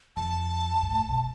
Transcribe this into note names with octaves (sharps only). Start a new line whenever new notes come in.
F2 A5
G2
A2
B2